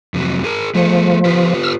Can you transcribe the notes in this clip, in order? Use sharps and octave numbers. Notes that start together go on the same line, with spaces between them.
F2 C3 F#3
G#4 A#4
F3 A3 G#4 A4
F4 G4 B4
E6 F6